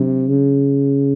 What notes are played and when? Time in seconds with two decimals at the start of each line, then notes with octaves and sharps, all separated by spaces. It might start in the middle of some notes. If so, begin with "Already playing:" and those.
Already playing: C3 F#3 D4
0.28 C#3